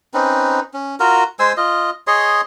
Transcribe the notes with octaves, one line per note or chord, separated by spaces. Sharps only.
C4 C#4 D#4 B4
C#4
F4 F#4 A#4
G#3 C5 G#5 E6
F4 D#5
G#4 C#5 D#5 C6